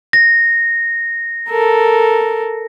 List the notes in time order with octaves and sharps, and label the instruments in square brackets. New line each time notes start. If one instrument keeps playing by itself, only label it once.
[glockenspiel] A#6
[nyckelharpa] A4 A#4